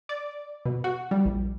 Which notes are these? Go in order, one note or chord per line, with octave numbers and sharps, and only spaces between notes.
D5
B2
F#4
G3
A#1